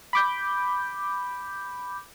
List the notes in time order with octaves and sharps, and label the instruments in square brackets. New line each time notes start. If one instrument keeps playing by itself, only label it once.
[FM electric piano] B5 D6 G6